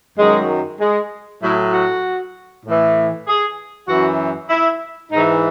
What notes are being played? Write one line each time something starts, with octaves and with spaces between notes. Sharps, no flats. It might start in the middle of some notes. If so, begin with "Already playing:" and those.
F#2 D#3 F#3 G#3
G#3
A2 F#3 E4
F#4
A2
E3
G#4
F#2 E3 F#4
E4
G#2 E3 D#4